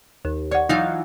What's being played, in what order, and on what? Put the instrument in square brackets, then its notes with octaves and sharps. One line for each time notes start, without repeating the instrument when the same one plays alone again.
[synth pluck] D#2
[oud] C#5 [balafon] D5 F#5
[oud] E3 F#3 F4 [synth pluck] D#4 F5